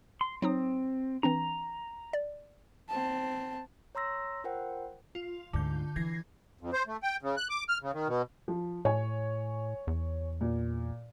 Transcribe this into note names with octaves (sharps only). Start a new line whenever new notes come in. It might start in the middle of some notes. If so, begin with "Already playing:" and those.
C6
F#3 C4 D#4 D#6
E3 C4 D4 A#5
D5
C4 A5
C#5 A#5 C6 E6 A#6
F4 A#4 C5 F#5 G5
F4
D2 G#2 D3 G6
E3 G#6 A#6 C7
F2
C5
A3
G5
C#3
F#6
D6
F6
C#3
D#3
B2
F3
A2 C#5 G#5
E2
A#2